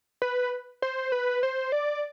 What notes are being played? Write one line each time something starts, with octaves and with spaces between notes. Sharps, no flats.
B4
C5
B4
C5
D5